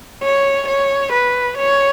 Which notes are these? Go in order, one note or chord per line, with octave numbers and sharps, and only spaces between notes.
C#5
C#5
B4
C#5